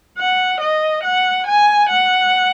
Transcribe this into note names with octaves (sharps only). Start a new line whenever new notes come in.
F#5
D#5
F#5
G#5
F#5